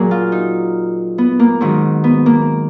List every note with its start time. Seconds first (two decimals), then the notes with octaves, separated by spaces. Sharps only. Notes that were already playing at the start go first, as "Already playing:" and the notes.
Already playing: A#2 F#3 G#4 A#4
0.11 F4
0.32 D#4
1.18 B3
1.40 A#3
1.61 G#2 D#3 F#3
2.04 B3
2.26 A#3